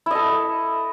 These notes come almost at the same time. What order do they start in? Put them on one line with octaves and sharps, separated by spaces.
E4 D#5 A4